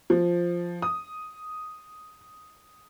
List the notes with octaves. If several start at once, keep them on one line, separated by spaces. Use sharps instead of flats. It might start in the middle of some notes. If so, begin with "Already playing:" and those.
F3
D#6